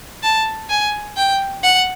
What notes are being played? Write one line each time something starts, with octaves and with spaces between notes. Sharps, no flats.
A5
G#5
G5
F#5